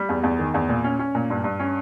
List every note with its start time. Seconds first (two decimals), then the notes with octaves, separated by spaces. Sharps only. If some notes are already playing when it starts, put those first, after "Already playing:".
Already playing: G3
0.09 E2
0.23 E2
0.39 D#3
0.54 E2
0.69 A#2
0.84 C#4
0.99 C#4
1.15 A#2
1.30 G2
1.44 G2
1.60 C#4